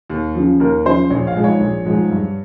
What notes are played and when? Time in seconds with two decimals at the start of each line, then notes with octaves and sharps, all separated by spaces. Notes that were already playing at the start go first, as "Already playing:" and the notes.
0.10 D#2
0.35 C#3 F3
0.60 D#2 A#4
0.85 C#3 F3 C5
1.10 A#1 C#5
1.27 F5
1.36 G#2 F3 G#3
1.44 C#5
1.60 A#1
1.85 G#2 F3 G#3
2.11 G2